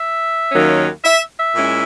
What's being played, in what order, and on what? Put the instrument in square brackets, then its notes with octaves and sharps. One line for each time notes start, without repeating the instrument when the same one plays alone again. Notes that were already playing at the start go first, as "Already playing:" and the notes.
Already playing: [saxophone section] E5
D#2 D#3 F#3 A#3 C#4
E5
E5
A#2 G#3 C#4 E4